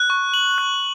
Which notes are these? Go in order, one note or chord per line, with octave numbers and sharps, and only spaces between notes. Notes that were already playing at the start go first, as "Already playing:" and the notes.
Already playing: F#6
C#6
F#7
F#6